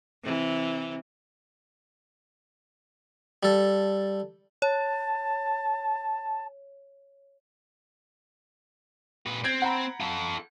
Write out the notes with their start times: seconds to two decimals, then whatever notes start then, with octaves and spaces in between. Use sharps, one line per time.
0.23 C3 E3
3.43 G3 A4
4.62 C#5 A5
9.26 A#2 B4
9.44 C4 G6 G#6 D7
9.62 F#5 A#5 B5
10.00 F4 A4